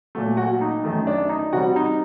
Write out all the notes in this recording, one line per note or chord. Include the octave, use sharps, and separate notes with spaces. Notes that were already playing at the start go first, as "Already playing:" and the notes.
A#2 F#3 A3
F#4
D#4
F#2 D#3 A3
D4
D#4
C3 G3 F#4
D#4